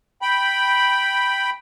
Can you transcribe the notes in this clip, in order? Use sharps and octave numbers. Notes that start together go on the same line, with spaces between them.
G5 B5